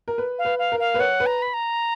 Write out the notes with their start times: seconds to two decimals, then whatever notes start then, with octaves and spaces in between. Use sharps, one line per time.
0.08 A#4
0.18 B4
0.39 F5
0.45 B4
0.59 F5
0.72 A#4
0.80 F5
0.94 B4
0.99 C#5 F#5
1.20 B4
1.26 A#5
1.42 B5
1.54 A#5